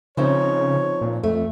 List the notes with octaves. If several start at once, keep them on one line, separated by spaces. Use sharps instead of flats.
C#3 F3 C4 D#4 C#5
A#2
F2 A3